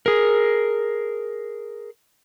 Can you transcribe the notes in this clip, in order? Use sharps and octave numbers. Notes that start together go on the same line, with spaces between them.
G#4 A#4